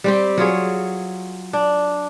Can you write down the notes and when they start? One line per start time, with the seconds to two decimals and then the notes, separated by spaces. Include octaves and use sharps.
0.04 G3 C4 G4
0.38 F#3 F4 G#4 C#5
1.53 D4